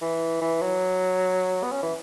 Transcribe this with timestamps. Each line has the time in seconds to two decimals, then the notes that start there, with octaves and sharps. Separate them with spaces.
0.02 E3
0.41 E3
0.62 F#3
1.63 B3
1.72 C#4
1.82 E3